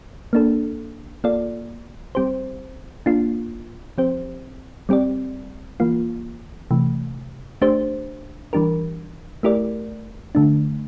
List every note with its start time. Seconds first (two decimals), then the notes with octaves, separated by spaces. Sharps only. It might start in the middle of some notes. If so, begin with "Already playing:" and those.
0.33 A#3 D4 A4
1.24 A#3 F4 A4 D5
2.15 G3 C4 G4 C5
3.06 A#3 D4 F4
3.98 F3 C4 G4 C5
4.89 G3 C4 G4 D5
5.80 E3 A#3 F4
6.71 C3 E3 A3
7.62 A3 D4 G4 C5
8.53 E3 G3 D4 G4 A#4
9.43 A3 E4 G4 A#4 D5
10.35 D3 A3 D4